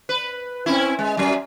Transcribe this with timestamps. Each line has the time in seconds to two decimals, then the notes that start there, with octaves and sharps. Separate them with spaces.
0.09 B4
0.66 C4 C#4 E4
0.99 G#3
1.17 F#2 F#3